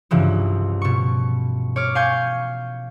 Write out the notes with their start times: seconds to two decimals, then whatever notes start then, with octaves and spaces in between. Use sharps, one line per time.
0.11 C2 G2 C#3 E3 F3
0.82 B2 C#6
1.76 C#5 D6 F6
1.95 F5 G#5 C#6 G6 G#6